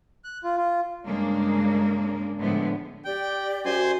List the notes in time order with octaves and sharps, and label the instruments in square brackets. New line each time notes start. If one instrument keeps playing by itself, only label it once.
[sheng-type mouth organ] F#6
F4
F4
[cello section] G2 C#3 G#3 A#3 D4
A2 D3 F3 G#3 B3
[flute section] G4 D5 [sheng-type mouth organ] G5
[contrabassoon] F#2 [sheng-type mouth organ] C5 G#5 C6